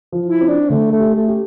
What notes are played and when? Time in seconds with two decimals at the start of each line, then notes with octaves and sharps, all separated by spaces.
0.12 F3
0.26 E4
0.41 C4
0.48 D4
0.70 D3 A3
0.92 A3
1.00 G4
1.15 A3
1.28 G4